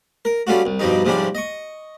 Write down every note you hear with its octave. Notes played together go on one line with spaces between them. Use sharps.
A#4
G3 A3 C#4 F4 F#4
C2
G2 B2 F3 G3 D#4
G#2 C3 F3 G3 C#4 D4
D#5 C#6